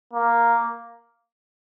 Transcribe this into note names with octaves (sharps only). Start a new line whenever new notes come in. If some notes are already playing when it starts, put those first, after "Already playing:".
A#3